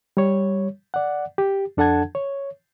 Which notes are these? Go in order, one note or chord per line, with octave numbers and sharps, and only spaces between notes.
G3 C#5
D5 F#5
G4
F2 D4 A4 F#5 A5 G#6
C#5